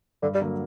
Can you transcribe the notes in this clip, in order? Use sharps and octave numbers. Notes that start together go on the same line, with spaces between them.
G2 D3
G3
D3 F#3 A#3